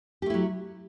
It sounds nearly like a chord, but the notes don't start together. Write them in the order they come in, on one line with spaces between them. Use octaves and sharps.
G4 A3 E4 F#3